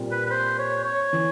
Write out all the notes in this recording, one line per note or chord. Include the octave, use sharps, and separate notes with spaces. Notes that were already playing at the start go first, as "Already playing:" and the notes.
Already playing: A#2 G3 C4 F4
B4
B4
C5
C#5
C#5
E3